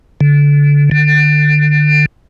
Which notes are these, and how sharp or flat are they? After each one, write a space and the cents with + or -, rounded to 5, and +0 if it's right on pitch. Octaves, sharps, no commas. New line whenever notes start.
D3 -25
D3 +25